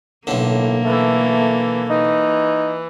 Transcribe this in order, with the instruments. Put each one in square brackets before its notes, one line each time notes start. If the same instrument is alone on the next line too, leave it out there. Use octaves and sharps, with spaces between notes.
[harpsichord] B1 D3 [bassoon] A2 [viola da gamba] A#3
[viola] E3 A4 [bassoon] A3
[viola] E3 [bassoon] D#4